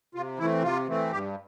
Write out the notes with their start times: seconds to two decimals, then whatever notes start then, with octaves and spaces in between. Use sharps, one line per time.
0.15 C3 F4
0.39 E3 A3 C4 E4
0.63 C3 F4
0.88 E3 A3 C4
1.12 G2 G4